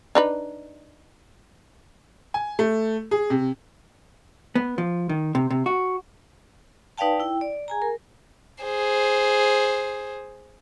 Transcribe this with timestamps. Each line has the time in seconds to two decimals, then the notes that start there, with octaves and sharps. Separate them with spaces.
0.15 D4 D#4 B4
2.34 G#5
2.59 A3
3.11 G#4
3.30 C3
4.55 B3
4.78 F3
5.09 D#3
5.35 C3
5.50 C3
5.66 F#4
6.98 D#4 B4 D5 F5 G5 A5
7.20 E4 G5
7.41 D5
7.68 G#4 G#5 A#5
7.82 A#4
8.64 G#4 C5